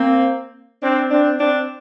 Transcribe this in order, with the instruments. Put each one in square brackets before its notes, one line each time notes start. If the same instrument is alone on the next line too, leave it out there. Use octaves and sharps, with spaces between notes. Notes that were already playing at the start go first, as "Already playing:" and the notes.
Already playing: [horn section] A#3 C4
C4 D4
C4 D4
C4 D4